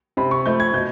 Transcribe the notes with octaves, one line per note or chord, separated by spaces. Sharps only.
C3 B5
C#6
F3 A3 G6
G#6
B2 G6